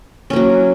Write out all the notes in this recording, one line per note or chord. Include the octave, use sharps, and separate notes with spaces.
F#3 A#3 C#4